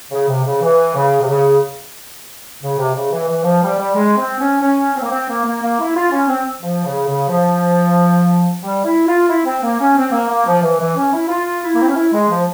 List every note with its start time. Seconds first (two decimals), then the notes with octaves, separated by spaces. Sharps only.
0.11 C#3
0.28 C3
0.44 C#3
0.61 E3
0.95 C#3
1.21 C3
1.28 C#3
2.62 C#3
2.78 C3
2.94 C#3
3.12 E3
3.28 E3
3.44 F3
3.62 G3
3.77 G3
3.95 G#3
4.17 C4
4.39 C#4
4.61 C#4
4.95 C4
5.02 A#3
5.10 C4
5.29 A#3
5.45 A#3
5.61 A#3
5.79 E4
5.95 F4
6.11 C#4
6.28 C4
6.62 F3
6.84 C#3
7.06 C#3
7.29 F3
8.62 G3
8.84 E4
9.07 F4
9.28 E4
9.45 C4
9.62 A#3
9.79 C#4
9.96 C4
10.12 A#3
10.29 A#3
10.45 F3
10.62 E3
10.79 E3
10.96 C#4
11.12 E4
11.28 F4
11.63 E4
11.75 A#3
11.82 C4
11.88 C#4
11.95 E4
12.13 G#3
12.29 F3